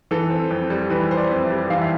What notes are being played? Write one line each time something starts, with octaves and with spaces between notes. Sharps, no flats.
E3 A4
C4
F2
G3
E3 B4
C4 C5
D5
F2
E5
G3
E3 F5
E5